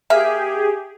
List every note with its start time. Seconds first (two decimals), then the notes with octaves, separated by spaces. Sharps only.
0.10 A#3 G4 G#4 E5